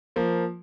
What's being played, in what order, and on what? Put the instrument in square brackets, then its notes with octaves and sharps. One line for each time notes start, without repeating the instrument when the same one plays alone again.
[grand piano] F3 A#3